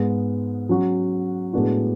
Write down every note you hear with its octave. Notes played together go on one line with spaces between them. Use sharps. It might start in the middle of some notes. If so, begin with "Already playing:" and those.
Already playing: G#2 G#3 B3
F#3 C#4 F#4
A2 G#3 B3 D4 F#4